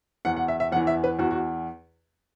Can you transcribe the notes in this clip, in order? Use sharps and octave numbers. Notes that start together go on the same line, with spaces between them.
E2 E3 F#5
F#5
E5
E5
E2 E3 F#5
E5
B4
E2 E3 F#4
F#4